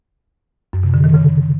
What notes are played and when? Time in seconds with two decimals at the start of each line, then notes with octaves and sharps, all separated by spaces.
0.73 F#2
0.84 C3
0.94 D3
1.04 D#3
1.14 C#3